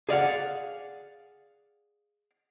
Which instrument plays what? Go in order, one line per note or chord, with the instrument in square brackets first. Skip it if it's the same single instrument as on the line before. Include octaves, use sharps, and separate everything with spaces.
[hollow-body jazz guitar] G#4 D5 F5 F#5